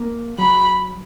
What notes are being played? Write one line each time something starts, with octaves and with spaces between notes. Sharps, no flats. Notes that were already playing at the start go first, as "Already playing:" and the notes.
Already playing: A#3
F#3 B5